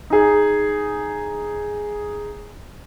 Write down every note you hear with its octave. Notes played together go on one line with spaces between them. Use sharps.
D#4 G#4